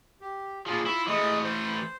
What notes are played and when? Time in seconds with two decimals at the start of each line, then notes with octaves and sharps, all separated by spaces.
0.21 G4
0.66 A#2 F3 G#4
0.86 E4 F4 C6 C#6
1.07 E3 G#3 A3 D#6
1.44 C5